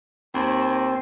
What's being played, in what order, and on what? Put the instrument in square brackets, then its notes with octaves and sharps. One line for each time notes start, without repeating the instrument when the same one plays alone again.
[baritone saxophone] D#2 [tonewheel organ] C4